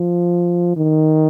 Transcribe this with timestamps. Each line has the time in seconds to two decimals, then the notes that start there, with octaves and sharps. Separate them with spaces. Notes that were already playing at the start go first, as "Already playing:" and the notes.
Already playing: F3
0.77 D#3